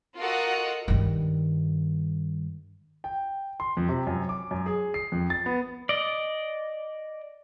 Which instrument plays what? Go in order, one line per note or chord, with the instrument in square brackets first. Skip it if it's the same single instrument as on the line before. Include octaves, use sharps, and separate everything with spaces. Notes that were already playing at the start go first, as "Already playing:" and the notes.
[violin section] F4 F#4 A4 A#4 D#5 F#5
[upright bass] G2 D#3
[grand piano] G5
C6
F2
C3
F#2
D6
F#2
G#4
C7
F2
A6
B3
[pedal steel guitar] D5 D#5